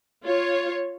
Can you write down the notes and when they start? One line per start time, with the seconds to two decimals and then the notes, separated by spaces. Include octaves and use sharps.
0.24 F4 C#5